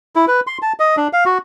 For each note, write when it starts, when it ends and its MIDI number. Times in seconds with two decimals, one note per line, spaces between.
0.16 0.25 64
0.28 0.40 71
0.47 0.58 84
0.62 0.73 81
0.79 0.96 75
0.97 1.08 62
1.13 1.24 77
1.26 1.38 66